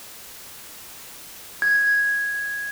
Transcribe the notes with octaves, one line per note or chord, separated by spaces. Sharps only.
G#6